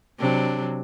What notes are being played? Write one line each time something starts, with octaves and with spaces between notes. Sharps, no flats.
C3 F#3 D4